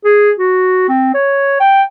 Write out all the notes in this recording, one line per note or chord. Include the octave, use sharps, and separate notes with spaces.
G#4
F#4
C4
C#5
G5